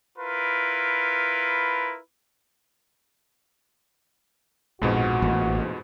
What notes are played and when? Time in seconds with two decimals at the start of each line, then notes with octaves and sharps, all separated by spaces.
0.18 E4 F4 A#4 B4
4.82 A#1 F2 G#2 B2 F#4
5.22 A1 A#2